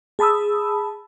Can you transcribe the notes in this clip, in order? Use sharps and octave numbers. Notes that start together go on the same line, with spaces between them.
G#4 A5 B5 D#6 E6